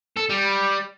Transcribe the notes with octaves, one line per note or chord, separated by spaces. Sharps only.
A4
G3